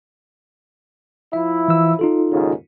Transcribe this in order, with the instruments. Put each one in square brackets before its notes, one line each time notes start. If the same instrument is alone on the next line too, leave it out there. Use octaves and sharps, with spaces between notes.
[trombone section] F3 E4 [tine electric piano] E5
[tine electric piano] E3 E6
D#4 F4 A4
[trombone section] D#2 G#2 C#3